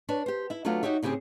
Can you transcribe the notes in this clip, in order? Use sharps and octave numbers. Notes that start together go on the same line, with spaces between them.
D4 B4 C#5
G4 C5
E4 E5
F#3 A3 B3 D4 F4 F#4
D#4 F#4 G4 C#5 E5
A2 C#3 C4 G4 G#4